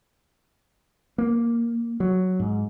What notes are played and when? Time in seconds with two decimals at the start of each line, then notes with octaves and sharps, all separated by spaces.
1.18 A#3
2.00 F#3
2.40 G#2